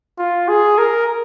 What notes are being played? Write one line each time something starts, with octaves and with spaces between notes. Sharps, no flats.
F4
G#4
A#4